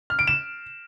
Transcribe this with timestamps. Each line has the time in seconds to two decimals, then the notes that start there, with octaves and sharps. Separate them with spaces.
0.10 F6
0.19 D7
0.27 E7